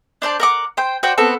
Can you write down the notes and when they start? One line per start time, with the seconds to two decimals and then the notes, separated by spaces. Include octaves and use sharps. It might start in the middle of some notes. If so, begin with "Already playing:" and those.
0.22 D4 C5 D5 A5
0.40 A#4 F#5 D6
0.77 C5 G5
1.03 F#4 C5 D5 G5
1.18 B3 C4 F#4 A4